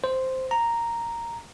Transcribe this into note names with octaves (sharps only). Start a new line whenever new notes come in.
C5
A#5